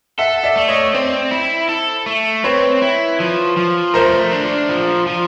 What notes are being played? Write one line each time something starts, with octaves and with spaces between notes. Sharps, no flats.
A4 E5 F#5
D5 E5
A3
C#5 D#5
C4 C5 D5
E4
A4
A3
C4 B4 C#5
E4
F3
F3
A3 A#4 C5
D4
F3
F3